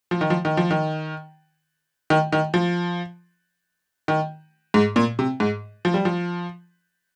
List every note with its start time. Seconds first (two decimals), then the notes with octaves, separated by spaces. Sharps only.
0.11 F3
0.21 D#3
0.30 F3
0.45 D#3
0.57 F3
0.71 D#3
2.10 D#3
2.32 D#3
2.54 F3
4.08 D#3
4.74 G#2
4.96 A#2
5.19 C3
5.40 G#2
5.85 F3
5.94 G3
6.05 F3